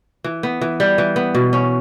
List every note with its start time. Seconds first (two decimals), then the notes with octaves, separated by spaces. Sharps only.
0.24 E3
0.43 B3
0.61 E3
0.80 G3
0.98 E3
1.16 B3
1.35 B2
1.53 C#4